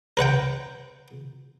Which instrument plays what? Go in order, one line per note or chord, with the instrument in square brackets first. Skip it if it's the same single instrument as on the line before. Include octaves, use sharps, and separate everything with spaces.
[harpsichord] A#4 B4 F#5 G5